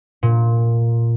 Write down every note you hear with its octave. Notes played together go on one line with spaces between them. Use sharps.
A#2